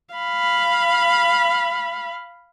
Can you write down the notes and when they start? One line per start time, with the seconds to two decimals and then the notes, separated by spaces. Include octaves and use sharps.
0.15 F5 B5